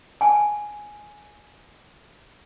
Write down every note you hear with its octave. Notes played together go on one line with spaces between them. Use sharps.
G#5 A5